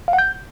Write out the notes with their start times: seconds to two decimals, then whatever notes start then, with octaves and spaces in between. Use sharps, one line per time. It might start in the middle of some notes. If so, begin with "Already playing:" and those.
0.08 F5
0.13 F#5
0.19 G6